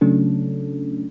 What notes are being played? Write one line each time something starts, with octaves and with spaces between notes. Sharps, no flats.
C#3 F#3 A3 C#4 D4 A4